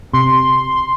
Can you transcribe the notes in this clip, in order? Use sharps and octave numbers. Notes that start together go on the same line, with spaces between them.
C3 C6